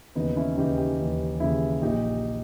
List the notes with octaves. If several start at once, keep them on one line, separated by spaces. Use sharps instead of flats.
D#2 C#3 E3 B3 D#4
C#4 E4
D#2 C#3 E3 D#4 G4
D#4 G4
D#2 C#3 E3
D#2 C#3 E3 E4 G#4
A#1 A#2 D#4 G4